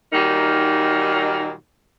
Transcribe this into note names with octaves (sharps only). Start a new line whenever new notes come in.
A#2 D#3 F#3 G3 A#3 D#4